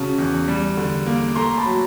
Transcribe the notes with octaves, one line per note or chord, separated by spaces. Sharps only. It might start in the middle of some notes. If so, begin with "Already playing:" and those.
Already playing: C#3 F#3 A5
E2
G3
D3
A#3
A3 A#5 C6
A5 B5
F#3